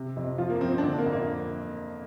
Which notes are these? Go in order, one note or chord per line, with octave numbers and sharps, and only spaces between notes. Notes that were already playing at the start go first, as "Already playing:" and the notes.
Already playing: C3
F2
F3 F4
A#3
F3 C4
C4
D4
D3 C4
A#3
F2
A#3